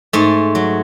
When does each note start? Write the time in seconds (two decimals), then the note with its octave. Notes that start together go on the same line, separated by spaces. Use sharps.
0.13 G#2 A3
0.55 F#3